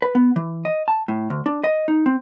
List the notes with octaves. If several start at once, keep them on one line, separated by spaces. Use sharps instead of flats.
B4
B3
E3
D#5
A5
A2
D2
D4
D#5
D#4
C4